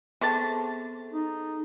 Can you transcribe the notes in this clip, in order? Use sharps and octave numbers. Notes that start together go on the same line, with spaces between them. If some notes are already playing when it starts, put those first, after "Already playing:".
C3 B3 G#4 A4 A5
D#4